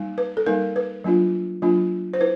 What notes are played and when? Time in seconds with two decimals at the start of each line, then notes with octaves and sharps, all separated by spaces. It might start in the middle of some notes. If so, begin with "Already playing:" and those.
Already playing: G3 A#3 D#4
0.18 B4
0.37 A4
0.46 G3 A#3 D#4 A#4
0.76 B4
1.04 F#3 A#3 D4 F4
1.62 F#3 A#3 D4 F4
2.14 C5
2.20 E4 B4